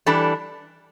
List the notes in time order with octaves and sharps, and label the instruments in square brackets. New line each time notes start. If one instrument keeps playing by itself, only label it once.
[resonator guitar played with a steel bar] E3 G3 D4 A4